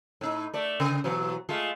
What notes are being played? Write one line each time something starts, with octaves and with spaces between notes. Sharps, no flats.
A2 D#4
A3 D5
C#3
B2 E3 F#3
G#3 A3 F4